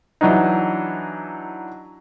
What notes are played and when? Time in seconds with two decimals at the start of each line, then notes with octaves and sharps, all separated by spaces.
0.21 E3 F#3 D4 D#4